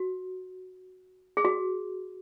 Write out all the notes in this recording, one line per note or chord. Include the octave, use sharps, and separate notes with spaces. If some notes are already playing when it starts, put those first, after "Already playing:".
Already playing: F#4
G#4
F#4